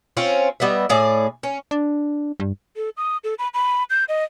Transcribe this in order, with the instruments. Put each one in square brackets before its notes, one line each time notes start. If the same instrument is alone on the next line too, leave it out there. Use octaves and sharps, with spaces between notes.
[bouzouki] C4 C#4 F4
G3 B3 D#5 E5
A2 G#4 D5
C#4
[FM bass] D4
G2
[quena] A4
D#6
A4
B5
B5
G6
D#5